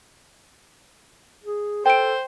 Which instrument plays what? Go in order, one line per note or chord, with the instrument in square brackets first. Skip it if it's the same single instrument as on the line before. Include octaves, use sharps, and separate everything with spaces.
[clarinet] G#4
[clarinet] A4 [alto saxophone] C5 [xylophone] G5 D7